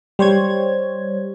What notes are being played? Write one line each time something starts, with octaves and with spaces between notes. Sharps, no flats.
G3 C5 C#5 G#6